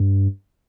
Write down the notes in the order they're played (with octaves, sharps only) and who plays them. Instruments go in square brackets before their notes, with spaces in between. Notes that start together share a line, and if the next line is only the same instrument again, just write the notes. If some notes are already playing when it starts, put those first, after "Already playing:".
Already playing: [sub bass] G2